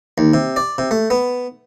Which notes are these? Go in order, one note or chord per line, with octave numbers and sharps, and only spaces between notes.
D#2
C3
D5
C3
A3
B3